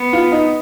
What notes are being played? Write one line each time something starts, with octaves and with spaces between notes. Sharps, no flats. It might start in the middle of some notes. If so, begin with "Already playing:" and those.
Already playing: B3
F4
D#4